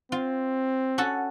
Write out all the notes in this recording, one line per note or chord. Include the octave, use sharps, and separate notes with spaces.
C4 F4
C#4 F#4 A4